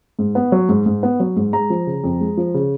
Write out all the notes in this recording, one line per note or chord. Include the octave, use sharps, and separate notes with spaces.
G#2
B3
F#3
G#2
G#2
B3
F#3
G#2
G#3 A#5
F3
C#3
F2
G#3
F3
C#3